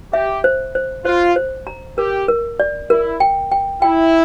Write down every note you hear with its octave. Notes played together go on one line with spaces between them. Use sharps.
G4 E5
C5
C5
F4 C5
C5
A#5
G4 A#4
A#4
D5
E4 A#4
G5
G5
E4 G5